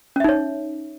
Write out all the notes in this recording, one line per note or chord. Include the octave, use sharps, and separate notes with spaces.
C#4 D#4 C#5 E5